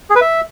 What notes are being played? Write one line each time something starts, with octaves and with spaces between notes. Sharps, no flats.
G#4
B4
E5